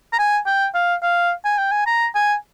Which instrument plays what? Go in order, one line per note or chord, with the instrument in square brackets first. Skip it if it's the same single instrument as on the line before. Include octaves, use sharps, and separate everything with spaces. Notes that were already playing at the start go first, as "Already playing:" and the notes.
[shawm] A#5
G#5
G5
F5
F5
G#5
G5
G#5
A#5
G#5